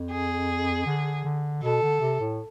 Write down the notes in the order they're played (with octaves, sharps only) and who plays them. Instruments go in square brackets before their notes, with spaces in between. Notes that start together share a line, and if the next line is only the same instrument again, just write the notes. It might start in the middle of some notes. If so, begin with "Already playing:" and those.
Already playing: [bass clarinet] F2
[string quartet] G#4
[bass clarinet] D3
D3
[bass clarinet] B2 [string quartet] A4
[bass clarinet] D3
C3
A2